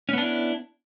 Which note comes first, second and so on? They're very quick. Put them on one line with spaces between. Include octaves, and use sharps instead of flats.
C#4 B3 D4 E4